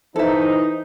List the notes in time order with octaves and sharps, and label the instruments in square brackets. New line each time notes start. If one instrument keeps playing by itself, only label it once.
[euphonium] E3 [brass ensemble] D#4 [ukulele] A4 E5 [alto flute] C5